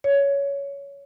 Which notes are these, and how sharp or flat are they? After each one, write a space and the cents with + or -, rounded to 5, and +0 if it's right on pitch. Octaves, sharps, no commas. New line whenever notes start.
C#5 +15